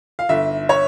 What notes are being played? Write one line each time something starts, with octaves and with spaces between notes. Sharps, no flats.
F5
G1 E5
C#5